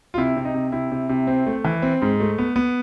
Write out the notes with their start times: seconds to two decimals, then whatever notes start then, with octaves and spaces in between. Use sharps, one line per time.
0.14 F4
0.18 C3 E4
0.37 C3
0.45 D#4
0.54 C3
0.72 C3 E4
0.92 C3
1.09 C3
1.27 C4
1.46 A3
1.64 E3
1.82 C4
2.02 G#2
2.20 A3
2.38 B3
2.56 B3